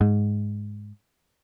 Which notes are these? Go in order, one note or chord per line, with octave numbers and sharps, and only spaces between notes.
G#2